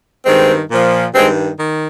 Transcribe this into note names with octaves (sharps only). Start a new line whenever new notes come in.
G2 D#3 G#3 C4
A#2 F3
G2 D#3 G#3 C4
D#3